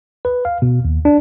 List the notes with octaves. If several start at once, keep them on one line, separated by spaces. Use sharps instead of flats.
B4
F5
B2
D#2
D4